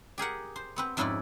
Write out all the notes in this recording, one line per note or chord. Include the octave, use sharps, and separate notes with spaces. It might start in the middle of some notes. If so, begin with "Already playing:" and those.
G4 G#4 A#4 F#5
C5
B3 C4 B4
F2 G#2 C#4 E4 B4 D5